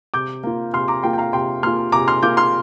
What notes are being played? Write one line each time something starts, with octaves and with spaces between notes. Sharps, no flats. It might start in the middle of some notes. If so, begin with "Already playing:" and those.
C3 D6 G6
A#3 F4
C3 C6 F6
A#5 D6
A#3 F4 G5 C6
G5
F5 A#5
C3 G5 C6
A#3 F4 C6 F6
C3 A#5 D6
C6 F6
A#3 F4 D6 G6
C6 F6